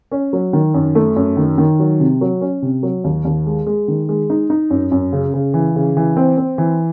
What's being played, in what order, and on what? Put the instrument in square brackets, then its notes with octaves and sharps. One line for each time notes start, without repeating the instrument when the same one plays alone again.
[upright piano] C#4
F#3
D#3
F#2
A3
F#2
D#3
D#3
F#3
C3
F#3
C#4
C3
F#3
D#2
D#2
G#3
G#3
D#3
G#3
D#4
D#4
F#2
F#2
C#3
C#3
E3
C#3
E3
C4
C4
E3